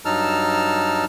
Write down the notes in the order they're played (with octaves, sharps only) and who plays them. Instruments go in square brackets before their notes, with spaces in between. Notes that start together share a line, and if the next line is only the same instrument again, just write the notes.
[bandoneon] G2 F#3 D#4 A5 E6 F6